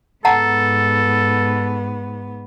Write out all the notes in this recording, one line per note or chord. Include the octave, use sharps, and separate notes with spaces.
G#2 B3 A4 F#5 A5 A#5